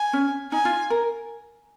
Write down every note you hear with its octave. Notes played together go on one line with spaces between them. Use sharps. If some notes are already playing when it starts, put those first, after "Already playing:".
Already playing: G#5
C#4
D#4 G#5
F4
A#4